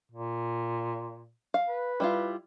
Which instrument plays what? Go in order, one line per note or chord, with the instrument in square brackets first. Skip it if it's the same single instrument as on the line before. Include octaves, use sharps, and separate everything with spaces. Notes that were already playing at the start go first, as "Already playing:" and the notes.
[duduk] A#2
[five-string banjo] F5
[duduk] B4
[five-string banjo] G3 E4 F4